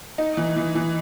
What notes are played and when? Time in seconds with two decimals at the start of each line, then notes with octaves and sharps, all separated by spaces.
0.18 D#4
0.37 E3
0.56 E3
0.75 E3